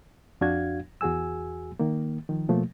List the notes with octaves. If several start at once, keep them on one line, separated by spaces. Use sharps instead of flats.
F2 D4 F#4 F5 G#6
E2 F#4 G#4 G#5 E6
D#3 A#3
D#3 F3
B2 F3 A3 A#3